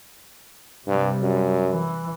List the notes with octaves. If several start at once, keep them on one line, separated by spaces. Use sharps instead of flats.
G2 C3 G3
F#2
E3